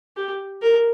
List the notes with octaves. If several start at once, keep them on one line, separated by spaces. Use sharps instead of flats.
G4
A#4